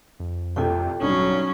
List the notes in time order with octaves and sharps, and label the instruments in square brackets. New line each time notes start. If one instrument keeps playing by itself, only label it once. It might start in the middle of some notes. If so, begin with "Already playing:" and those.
[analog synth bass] F2
[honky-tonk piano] C2 C3 A3 [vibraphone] F4 A4 G5
[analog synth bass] D1 [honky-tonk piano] B1 G2 [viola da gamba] F#3 C#4 [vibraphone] D#6